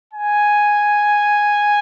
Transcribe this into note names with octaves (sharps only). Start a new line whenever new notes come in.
G#5